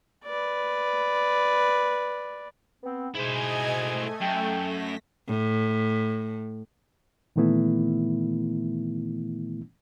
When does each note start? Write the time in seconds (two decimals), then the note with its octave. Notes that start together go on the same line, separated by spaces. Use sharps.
0.25 B4 D5
2.83 B3 C4
3.15 G#2 B2 E4 C5 D#5 G#5 G#6
3.78 A3
4.21 F#2 G5
4.55 A#6 B6
5.28 A2
7.36 A#2 D#3 E3 A3 B3 E4